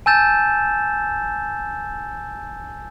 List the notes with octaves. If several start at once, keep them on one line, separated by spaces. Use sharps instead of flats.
G#5 A5 E6 G6 A6 E7